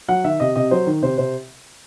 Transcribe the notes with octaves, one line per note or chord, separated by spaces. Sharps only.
F#3 F#5
D#3 E5
C3 D#5
C3 D#5
F#3 C5
D#3
C3 C5
C3 C5